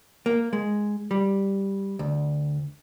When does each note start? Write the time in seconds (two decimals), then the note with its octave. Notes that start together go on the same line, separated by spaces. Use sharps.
0.26 A#3
0.53 G#3
1.11 G3
1.99 D2